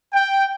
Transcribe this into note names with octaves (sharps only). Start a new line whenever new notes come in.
G5